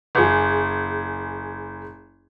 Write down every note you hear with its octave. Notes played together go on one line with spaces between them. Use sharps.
F#1 G#4